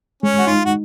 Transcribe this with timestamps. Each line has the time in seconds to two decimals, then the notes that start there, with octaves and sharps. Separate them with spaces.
0.23 G#3 C#4
0.39 F#4
0.47 D#4 F4
0.65 F#4